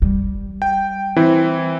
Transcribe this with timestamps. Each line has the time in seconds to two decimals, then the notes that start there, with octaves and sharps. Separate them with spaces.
0.02 G3
0.62 G5
1.16 E3 C4 E4